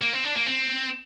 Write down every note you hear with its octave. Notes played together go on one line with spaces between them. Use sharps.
A#3
C4
D4
A#3
C4